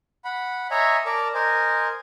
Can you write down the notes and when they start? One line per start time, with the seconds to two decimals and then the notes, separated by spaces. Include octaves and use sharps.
0.24 F#5 B5
0.71 C#5 D#5 E5 G#5 A#5
1.05 A#4 D5 A5 A#5
1.34 A#4 C5 D#5 G#5